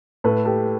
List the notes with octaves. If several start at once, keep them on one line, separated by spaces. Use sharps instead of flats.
A2 A4 B4
G4 A4